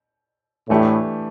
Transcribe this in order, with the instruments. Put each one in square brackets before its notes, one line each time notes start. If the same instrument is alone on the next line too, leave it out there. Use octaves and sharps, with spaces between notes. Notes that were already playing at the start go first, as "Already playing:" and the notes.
[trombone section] A2 [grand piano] E3 A3 D4 G4